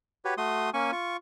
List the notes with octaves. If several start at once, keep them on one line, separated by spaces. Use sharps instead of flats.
F#4 G4 B4 C#5
A3 F#4 C6 D#6
A#3 C#4 G#5 C#6
F4 C#6